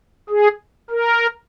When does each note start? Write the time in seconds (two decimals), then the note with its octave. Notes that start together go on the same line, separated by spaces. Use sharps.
0.30 G#4
0.90 A#4